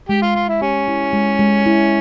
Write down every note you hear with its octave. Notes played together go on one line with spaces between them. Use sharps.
G#3 G4
F4
G#3 F4
E4
C#4 G4
E4
G#3
G#3
E4